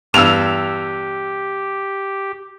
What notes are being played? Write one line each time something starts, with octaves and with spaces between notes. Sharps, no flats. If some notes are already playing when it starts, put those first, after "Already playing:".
E2 G2 G4 E6 F7